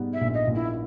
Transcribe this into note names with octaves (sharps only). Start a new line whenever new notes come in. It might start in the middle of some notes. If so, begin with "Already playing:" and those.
Already playing: G#2 G3 B3
E5
A#1
D#5
A#1
E4